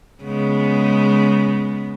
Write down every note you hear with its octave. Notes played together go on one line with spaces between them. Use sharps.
C#3 G#3 B3